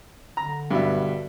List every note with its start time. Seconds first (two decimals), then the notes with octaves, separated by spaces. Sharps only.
0.37 D3 A#5
0.71 G2 B2 E5